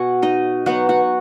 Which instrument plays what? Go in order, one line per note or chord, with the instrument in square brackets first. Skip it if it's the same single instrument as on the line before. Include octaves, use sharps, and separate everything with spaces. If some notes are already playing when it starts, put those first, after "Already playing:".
Already playing: [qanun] B2 F#4 F#5 G#5
D#4 D#5
F#3 B3 D#4 F#4 F#5
F#4 F#5